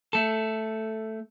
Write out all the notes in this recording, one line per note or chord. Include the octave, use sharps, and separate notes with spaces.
A3 A4